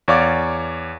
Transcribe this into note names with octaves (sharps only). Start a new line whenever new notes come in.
E2 C#5 D5 F5 D6